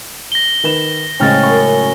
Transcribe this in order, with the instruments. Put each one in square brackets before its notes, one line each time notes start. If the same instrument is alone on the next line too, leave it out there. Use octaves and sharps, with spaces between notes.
[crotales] A#6 G7
[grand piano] D#3 B4 E7
[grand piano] A2 C#3 G#3 [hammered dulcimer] C#4 C#5 [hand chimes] G5 F6 A6
[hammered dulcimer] F#2 [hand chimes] C#6